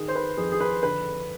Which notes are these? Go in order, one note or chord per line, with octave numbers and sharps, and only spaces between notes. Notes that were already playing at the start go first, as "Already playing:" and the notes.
Already playing: D#3 G#4
C5
B4
F2 G#4
G#4
B4
D3 B4